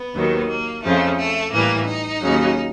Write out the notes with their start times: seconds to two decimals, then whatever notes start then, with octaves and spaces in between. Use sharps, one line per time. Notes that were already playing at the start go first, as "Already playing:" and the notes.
Already playing: B3
0.15 D#2 D#3 F#3
0.49 A#3
0.83 F2 C#3 F3 A3
1.18 A3
1.52 A2 E3 G3 A#3
1.87 D#4
2.21 D#2 C#3 F#3